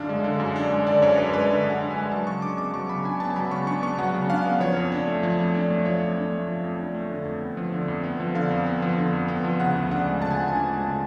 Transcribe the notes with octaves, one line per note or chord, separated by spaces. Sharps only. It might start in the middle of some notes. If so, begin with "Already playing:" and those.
Already playing: F#2 D3 D4 F5
G#3
D3
F#2
D4
G#3
D3 D5
F#2 C#5
D4 B4
G#3 B4
D3
F#2 F#5
D4
G#5
G#3
F#3 A5
C#3 C#6
D4 D6
B3 D6
F#3 C#6
C#3 B5
D4 G#5
B3 A5
A5
F#3 B5
C#3 C#6
D4 C#6
B3 C#6
F#3 F#5
C#3
D4 F5
B3
F3 C#5
F2
D4
A3
F3
F2
D4
A3
F3 C#5
F2
D4
A3
F3
F2
D4
A3
D3
F2
B3
F3
D3
F2
B3
F3
D3 F5
F2
B3
F3
D3
F2
B3
F3
C#3 F#5
D2
D4 F#5
G#3
C#3 A5
G#5
D2 F#5
G#5
D4
G#3
C#3